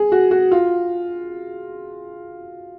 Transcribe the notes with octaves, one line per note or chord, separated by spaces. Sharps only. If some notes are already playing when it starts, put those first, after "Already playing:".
Already playing: G#4
F#4
F#4
F4